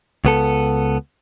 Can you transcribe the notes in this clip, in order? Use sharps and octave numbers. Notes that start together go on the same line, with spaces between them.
C#2 B3 A4